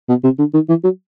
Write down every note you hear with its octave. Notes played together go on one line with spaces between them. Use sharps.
B2
C3
D3
D#3
E3
F#3